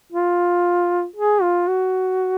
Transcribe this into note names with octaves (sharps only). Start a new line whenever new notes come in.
F4
G#4
F4
F#4